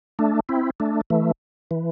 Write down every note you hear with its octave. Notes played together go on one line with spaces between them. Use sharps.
A3 D4
C4 E4
A3 D4
E3 A3
E3